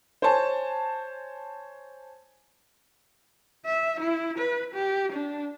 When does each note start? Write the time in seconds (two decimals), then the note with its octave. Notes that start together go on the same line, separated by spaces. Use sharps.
0.22 C5 C#5 G#5 A5
3.66 E5
4.00 E4
4.38 B4
4.74 G4
5.12 D4